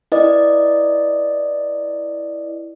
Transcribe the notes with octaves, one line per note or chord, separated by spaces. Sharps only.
E4 B4 D5 D#5